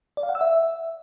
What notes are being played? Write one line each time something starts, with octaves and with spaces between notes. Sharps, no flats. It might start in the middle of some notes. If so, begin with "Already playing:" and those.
D5
F5
F#5
E6
E5